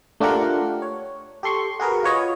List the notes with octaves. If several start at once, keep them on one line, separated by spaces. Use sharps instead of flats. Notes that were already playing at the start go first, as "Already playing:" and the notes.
A3 D4 F4 G4 A#4 F#5
C#5
G4 A4 C6 C#6
F#4 G#4 A#4 B4
F4 B4 C#5 D#5